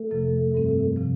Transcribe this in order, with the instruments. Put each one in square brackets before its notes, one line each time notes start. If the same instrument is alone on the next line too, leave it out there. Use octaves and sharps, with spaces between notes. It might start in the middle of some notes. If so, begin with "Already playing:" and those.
Already playing: [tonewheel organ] A3
[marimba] F2 C3 F3
G2 G3 C4
C3 F3